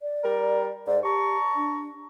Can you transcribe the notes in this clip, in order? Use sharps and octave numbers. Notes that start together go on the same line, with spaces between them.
D5
G3 A#4
G#2 D5
G4 A5 A#5 C#6
D4